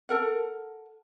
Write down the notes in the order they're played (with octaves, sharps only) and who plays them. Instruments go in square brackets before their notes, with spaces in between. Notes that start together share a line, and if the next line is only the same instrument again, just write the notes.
[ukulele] A4 A#4 F#5